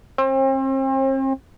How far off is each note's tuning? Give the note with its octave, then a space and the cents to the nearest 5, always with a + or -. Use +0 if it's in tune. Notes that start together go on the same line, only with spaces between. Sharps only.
C4 +40